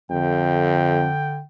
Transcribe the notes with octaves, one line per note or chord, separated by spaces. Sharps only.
F2 D3 G5